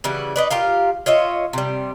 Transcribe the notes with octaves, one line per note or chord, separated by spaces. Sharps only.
C#3 E3 G3 F#4
D#4 B4 D5
F4 G4 A#4 F5
F4 C#5 D#5 E5
C3 G3